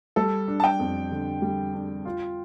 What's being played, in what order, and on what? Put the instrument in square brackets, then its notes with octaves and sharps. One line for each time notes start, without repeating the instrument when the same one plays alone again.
[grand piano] G3 [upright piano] A4
[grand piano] D4
[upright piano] A5
G5
[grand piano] F2
D3
G3
D4
F4